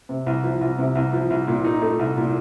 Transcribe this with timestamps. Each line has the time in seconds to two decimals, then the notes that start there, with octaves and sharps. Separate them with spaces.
0.09 C3
0.26 C2
0.43 F3
0.61 C2
0.78 C3
0.95 C2
1.13 F3
1.30 C2
1.47 A#2
1.64 D#4
1.82 A3
1.99 C2
2.17 A#2